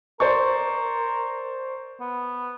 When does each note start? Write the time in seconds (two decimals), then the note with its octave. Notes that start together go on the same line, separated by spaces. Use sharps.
0.20 A#4 C5 D5 C#6
2.00 B3